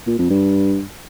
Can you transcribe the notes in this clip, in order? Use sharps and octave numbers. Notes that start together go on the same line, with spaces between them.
A#2
F2
G2